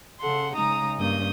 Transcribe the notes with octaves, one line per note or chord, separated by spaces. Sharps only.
C#3 A4 F#5 C6
C#3 G#3 D#4 A#5 D#6
G2 A#3 C#4 D#6 G6